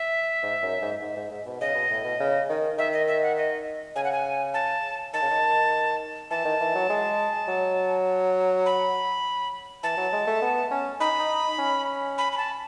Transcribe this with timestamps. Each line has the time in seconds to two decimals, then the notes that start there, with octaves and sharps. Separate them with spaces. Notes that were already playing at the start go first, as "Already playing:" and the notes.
Already playing: E5
0.43 G#2
0.63 F#2
0.82 G#2
1.02 G#2
1.17 G#2
1.31 G#2
1.46 B2
1.61 C#3 D#5
1.75 B2
1.91 A2
2.04 B2
2.20 C#3
2.49 D#3
2.78 D#3 E5
2.93 D#5
3.08 E5
3.23 F#5
3.37 D#5
3.96 C#3 G#5
4.04 F#5
4.12 G#5
4.54 A5
5.13 D#3 A5
5.22 C#3
5.30 D#3
6.31 E3 A5
6.45 D#3
6.61 E3
6.75 F#3
6.89 G#3
7.48 F#3
8.66 B5
9.83 E3 A5
9.97 F#3
10.13 G#3
10.27 A3
10.42 B3
10.71 C#4
11.00 D#4 B5
11.19 D#4
11.59 C#4
12.18 B5
12.32 B5
12.38 A5